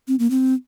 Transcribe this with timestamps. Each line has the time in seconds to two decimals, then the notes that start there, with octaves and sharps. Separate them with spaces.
0.08 C4
0.19 A#3
0.30 C4